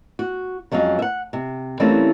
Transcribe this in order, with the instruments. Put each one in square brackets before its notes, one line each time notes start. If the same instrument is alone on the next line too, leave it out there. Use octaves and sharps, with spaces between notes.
[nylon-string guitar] F#4
F2 F#3 G#3 C#4 F5
E5 F#5
C3
E3 G3 A3 A#3 C4 C#4